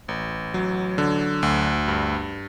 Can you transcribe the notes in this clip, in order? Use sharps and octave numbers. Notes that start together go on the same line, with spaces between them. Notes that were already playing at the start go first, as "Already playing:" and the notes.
A1
F#3
D3
D2
G2